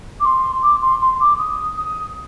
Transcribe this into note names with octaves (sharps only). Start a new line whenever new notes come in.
D6
C6
D6
C6
C6
D6
D#6
D#6